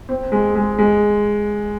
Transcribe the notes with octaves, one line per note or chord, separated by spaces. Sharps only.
C4
G#3
G#3
G#3